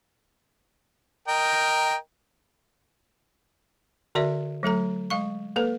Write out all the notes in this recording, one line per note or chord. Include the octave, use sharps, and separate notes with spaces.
A#4 D#5 G5
D3 F#4 A#4 D5 E5
F#3 A3 A4 A#5
G#3 F5 C#6
A#3 A4 B4